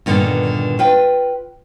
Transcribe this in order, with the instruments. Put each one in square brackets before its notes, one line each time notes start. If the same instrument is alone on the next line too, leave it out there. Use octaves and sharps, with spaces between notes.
[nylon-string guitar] G2 A#2 D3 D#3 B3
F4 B4 G5